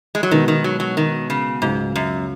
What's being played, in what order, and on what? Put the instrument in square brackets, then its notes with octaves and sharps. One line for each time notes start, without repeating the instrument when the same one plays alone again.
[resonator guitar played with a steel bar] G#3
F#3
[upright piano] B2 G#3 B3 D#4 [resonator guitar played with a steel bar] D#3
[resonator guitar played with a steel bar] D#3
F#3
F#3
D#3
C#3
[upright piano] C#2 C#3 F#3 [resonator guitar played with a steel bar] G#2
[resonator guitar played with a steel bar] F#2